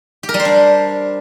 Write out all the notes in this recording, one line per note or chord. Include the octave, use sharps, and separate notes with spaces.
G4
A#4
G3
C5
D4